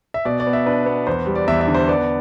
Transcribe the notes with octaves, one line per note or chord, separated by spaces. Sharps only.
E5
B2 D5
D5
B3
E5
D4 B4
B3
E2 C5
G3
D5
E2 E5
E5
D3
C5
B3 D5